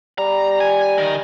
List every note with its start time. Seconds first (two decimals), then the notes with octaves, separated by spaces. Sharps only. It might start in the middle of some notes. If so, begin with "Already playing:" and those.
0.18 G3 A#5
0.60 G#5
0.98 D#3 A#4